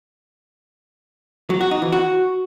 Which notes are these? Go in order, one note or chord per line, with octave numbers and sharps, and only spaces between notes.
F#3
F#4
D#4
E3
F#4